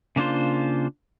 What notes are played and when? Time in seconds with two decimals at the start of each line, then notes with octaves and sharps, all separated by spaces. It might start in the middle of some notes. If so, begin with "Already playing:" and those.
0.16 C#3 A#3 D4 F4 C5